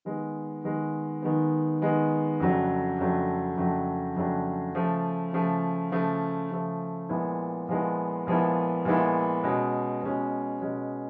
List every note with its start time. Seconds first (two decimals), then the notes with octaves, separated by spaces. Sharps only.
0.05 D#3 G#3 B3
0.64 D#3 G#3 B3
1.22 D#3 G#3 B3
1.82 D#3 G#3 B3
2.40 F2 C#3 F#3 A3 D4
2.99 F2 C#3 F#3 A3 D4
3.57 F2 C#3 F#3 A3 D4
4.16 F2 C#3 F#3 A3 D4
4.75 C#3 F3 A3
5.33 C#3 F3 A3
5.92 C#3 F3 A3
6.51 C#3 F3 A3
7.09 A#2 F3 G#3 B3 E4
7.69 A#2 F3 G#3 B3 E4
8.27 A#2 F3 G#3 B3 E4
8.85 A#2 F3 G#3 B3 E4
9.44 B2 G#3 C#4
10.03 B2 G#3 C#4
10.61 B2 G#3 C#4